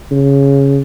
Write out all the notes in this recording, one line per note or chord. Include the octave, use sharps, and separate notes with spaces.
C#3